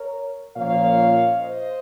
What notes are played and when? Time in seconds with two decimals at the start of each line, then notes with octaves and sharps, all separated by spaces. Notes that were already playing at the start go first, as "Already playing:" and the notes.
Already playing: A#4 C#5
0.56 A#2 F3 A#3 C#4 C#5 F5
1.40 C5 D#5